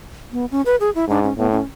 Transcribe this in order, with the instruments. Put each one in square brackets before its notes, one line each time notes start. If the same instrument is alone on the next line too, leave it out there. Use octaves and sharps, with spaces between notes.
[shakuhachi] B3
C#4
B4
G#4
E4
[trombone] G#2 [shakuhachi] D4
[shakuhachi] C#4
[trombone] A2 [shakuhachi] B3
[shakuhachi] C#4